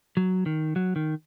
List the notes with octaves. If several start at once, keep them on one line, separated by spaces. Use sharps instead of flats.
F#3
D#3
F#3
D#3